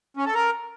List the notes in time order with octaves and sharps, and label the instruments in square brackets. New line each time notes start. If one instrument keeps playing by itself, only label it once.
[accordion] C#4
A4
A#4